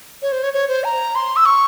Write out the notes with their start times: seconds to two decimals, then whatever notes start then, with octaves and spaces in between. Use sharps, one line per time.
0.22 C#5
0.32 C5
0.43 C#5
0.54 C#5
0.68 C5
0.84 A#5
1.15 C6
1.36 E6
1.46 C#6